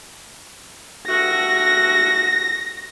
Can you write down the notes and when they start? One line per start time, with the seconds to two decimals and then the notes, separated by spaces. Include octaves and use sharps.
1.08 G2 A3 F#4 A#6